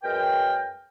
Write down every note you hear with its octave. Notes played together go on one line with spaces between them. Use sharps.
F#2 G#3 A#4 B4 G5